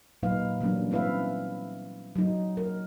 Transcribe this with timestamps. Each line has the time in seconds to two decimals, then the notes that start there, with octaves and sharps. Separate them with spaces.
0.23 A#2 F#3 A#3 D#4 B4 F5
0.61 E3 F#3 G3 A#3 C#4 D4
0.91 C4 C#4 E4 B4 E5 F5
2.16 F#3 D#4
2.57 A#4